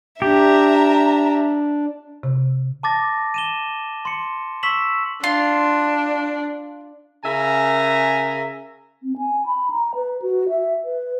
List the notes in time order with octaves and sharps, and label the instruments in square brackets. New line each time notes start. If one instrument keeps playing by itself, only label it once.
[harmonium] D4 [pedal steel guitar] G4 [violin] E5 A#5
[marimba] C3
[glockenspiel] A5 D6 A6 A#6
D#7 E7 G7
C6 C#7
C#6 E6 B6 E7 F#7
[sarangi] D4 [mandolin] F4 C6
[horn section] C#3 A#4 E5 G#5 A#5
[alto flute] C4
G#5
B5
A#5
B4
F#4
E5
B4